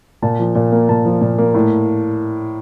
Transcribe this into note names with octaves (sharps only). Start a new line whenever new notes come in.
A#2 A5
F3
A#2
A#3
A#2 A5
F3
A#2
A#3
A2